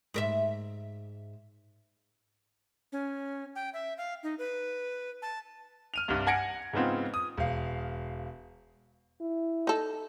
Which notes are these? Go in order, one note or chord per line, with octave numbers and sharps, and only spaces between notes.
G#2 A#4 E5
C#4
G5
E5
F5
D#4
B4
A5
F6 D#7 F7
C2 G2
F#5 G#5 G#6 A#6 C#7 D7
G#2 C#3 B3 C4 F4
D#6
E1 F5
E4
D#4 A4